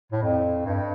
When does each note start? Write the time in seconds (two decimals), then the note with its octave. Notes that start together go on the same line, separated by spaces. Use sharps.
0.12 A2
0.23 F2
0.66 G2